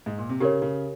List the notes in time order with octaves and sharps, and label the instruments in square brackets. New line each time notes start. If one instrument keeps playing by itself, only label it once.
[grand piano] G#2
A#2
C3
[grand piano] C#3 [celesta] G4 A#4 C#5
[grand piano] C#3